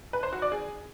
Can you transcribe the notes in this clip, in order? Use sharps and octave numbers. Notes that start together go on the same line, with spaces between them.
B4
C5
F#4
D5
G#4